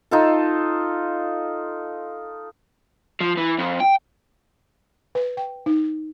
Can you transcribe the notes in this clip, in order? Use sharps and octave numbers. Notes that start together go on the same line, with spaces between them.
D#4 F4 A4
F3
E3
F2
G5
B4
G5
D#4